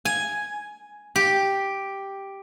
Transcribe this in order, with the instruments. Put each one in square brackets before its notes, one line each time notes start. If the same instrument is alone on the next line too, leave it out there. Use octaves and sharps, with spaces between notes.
[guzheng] G#5
G4